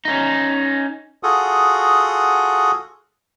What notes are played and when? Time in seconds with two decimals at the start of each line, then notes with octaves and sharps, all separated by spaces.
0.05 C#4 D#4
1.23 F4 F#4 G#4 A4 F#5 D#6